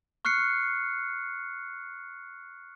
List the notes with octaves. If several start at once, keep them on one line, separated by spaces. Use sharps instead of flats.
C#6 F6 F#6 C7 C#7